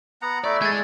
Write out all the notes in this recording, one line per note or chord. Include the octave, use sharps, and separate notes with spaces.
B3 F#5 A#5
A3 E4 D5
G#3 G#6 A6